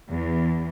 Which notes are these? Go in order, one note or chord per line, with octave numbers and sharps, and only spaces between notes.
E2